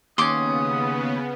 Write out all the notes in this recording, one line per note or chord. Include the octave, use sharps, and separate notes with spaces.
D#2 C#3 B3 C#4 C6 D6 D#6